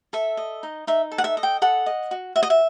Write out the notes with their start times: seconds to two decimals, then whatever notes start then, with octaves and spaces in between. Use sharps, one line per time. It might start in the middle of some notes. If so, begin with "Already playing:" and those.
0.13 A4 E5
0.37 D#5
0.63 D#4
0.87 D#4 E5
1.12 A4
1.18 F#5
1.24 E5
1.37 D#5
1.43 G5
1.62 A4 F#5
1.86 D#5
2.11 F#4
2.36 F#4 E5
2.43 D#5
2.50 E5